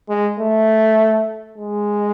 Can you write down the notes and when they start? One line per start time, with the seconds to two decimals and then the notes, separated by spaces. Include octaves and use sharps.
0.09 G#3
0.39 A3
1.58 G#3